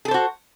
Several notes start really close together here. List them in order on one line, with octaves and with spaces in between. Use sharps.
G#4 A4 C5 F#4